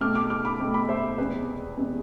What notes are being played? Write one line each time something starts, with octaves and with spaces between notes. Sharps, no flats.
B2 A3 C4 D6 F6
D6 F6
D6 F6
B5 D6
B2 A3 C4
B5 D6
C5 E5
E2 C3 G#3 G#4 B4
E2 C3 G#3